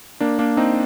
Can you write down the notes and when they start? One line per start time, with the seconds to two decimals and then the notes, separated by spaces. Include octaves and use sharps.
0.20 A#3 D4
0.39 A#3 D4
0.57 C4 D#4